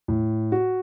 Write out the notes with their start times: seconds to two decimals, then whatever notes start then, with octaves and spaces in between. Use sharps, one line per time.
0.08 A2
0.52 F#4